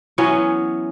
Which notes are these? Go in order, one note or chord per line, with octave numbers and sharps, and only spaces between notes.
E3 F#3 B3 C#4